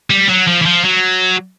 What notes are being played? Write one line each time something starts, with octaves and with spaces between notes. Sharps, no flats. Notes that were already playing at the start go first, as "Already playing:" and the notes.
G3
F#3
F3
E3
F3
F#3